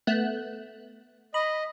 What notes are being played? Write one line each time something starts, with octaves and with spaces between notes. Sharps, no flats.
A3 B3 F#6
D#5 B5